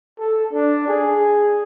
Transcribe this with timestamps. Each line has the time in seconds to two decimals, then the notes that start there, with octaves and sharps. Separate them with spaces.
0.19 A4
0.53 D4
0.88 G#4